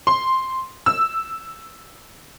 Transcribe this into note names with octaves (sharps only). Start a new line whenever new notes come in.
C6
E6